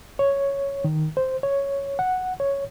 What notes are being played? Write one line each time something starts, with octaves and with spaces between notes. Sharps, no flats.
C#5
D#3
C5
C#5
F#5
C#5